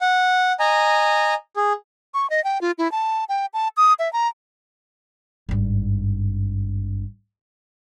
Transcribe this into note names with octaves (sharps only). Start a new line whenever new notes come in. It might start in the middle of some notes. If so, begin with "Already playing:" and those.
F#5
D#5 G#5 A#5
G#4
C#6
D#5
G5
F4
E4
A5
G5
A5
D#6
E5
A#5
G#1 G2